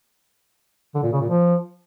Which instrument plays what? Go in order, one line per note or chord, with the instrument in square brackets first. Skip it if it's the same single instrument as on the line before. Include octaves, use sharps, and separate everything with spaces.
[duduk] D3
A#2
C#3
A#2
F3